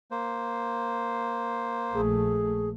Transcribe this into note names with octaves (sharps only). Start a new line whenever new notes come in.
A#3 C5
A#1 A3 G#4